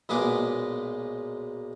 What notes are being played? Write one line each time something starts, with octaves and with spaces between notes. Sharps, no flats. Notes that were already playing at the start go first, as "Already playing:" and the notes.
B1 A#2 G#3 B3 G#4 D6